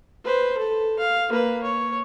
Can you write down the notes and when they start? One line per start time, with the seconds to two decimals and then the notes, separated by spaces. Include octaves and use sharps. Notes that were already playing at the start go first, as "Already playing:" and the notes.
0.24 B4 C5
0.58 A4
0.99 F5
1.29 A#3 B4
1.63 C#5